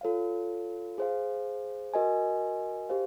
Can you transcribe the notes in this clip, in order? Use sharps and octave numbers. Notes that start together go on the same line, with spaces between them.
F4 A4 C#5 F5
G#4 C5 F5
F#4 A#4 D#5 G#5
G4 C5 F5